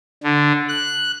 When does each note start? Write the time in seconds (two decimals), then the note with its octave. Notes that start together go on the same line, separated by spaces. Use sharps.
0.23 D3
0.69 F#6